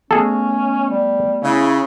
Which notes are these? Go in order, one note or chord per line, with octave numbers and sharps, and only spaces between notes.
A3 B3 C#4 G#4 A4
G3
C#3 E4